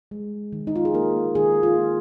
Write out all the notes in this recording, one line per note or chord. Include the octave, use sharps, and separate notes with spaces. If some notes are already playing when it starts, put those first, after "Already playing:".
G#3
D#3
D#4
F4
G#4
A#3 A#4
D#3 G#4
F4
A#3